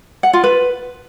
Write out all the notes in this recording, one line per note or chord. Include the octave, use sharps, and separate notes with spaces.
F#5
F4
B4